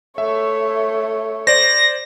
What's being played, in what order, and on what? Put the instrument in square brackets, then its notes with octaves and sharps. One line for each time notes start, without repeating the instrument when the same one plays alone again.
[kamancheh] A3 C#5 [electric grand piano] E5
[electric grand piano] C5 D5 [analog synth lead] A#6